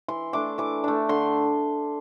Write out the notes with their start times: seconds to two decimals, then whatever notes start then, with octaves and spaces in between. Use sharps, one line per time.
0.08 E3 C6
0.33 A3 D4 D6
0.58 E3 D6
0.84 A3 D4
1.09 D3 C6